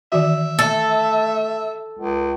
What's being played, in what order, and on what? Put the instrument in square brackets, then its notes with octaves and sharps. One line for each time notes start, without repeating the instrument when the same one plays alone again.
[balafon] D#3 E3 F#4 [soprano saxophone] E5
[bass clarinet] A3 [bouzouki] A4
[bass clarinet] C#2